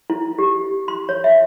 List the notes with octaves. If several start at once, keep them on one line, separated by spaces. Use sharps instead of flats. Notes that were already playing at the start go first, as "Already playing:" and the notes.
E4
G4
C6
C#5
E5